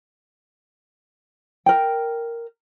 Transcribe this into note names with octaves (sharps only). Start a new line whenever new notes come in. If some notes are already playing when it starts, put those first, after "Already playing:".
A#4 G5